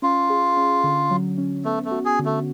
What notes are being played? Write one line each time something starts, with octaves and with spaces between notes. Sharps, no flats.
C#4 F4
G#4
C#4
D3
F#3
C#4
A3 B3
A3
F#4
G#4
D3
A3